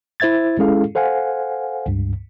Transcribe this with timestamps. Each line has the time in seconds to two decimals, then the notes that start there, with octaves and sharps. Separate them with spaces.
0.20 E4 C5 E5 G#6 A6
0.59 G#3 C#4 E4 G#4 A4 F5
0.95 A4 C5 F5 F#5 G#5
1.86 C#2 G2